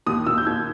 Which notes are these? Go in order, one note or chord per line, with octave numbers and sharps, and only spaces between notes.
D#2 D#6
D#2 E6
G6
D#2 G#6